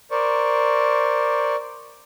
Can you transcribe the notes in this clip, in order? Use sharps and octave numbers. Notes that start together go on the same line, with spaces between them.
A#4 C5 D5 C#6